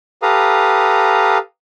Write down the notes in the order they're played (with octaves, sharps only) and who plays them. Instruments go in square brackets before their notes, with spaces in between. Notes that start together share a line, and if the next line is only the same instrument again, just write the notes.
[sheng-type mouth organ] G4 A4 B4 F5 A#5 D#6